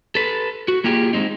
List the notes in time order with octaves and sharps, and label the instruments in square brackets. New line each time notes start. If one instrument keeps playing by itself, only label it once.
[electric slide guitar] A4 B4
F#4
A#3 F4 G4 G#4
G#3 C4 D#4